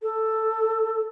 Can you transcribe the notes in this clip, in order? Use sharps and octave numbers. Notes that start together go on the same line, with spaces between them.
A4